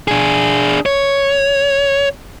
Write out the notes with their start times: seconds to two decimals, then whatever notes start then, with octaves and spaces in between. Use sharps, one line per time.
0.08 D4 G#4
0.86 C#5